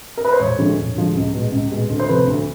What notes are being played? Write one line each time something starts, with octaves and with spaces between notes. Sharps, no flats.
A#4
B4
C5
E1 C#5
D2 D3 F3 G#3
E1
D2 D3 F3 G#3
C#2
B2 G#3
C#2
B2 G#3
D2
C5
C3 F3 A3 B4
D2